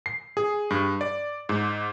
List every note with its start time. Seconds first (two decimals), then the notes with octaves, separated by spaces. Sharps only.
0.06 C7
0.37 G#4
0.70 G2
1.01 D5
1.49 G#2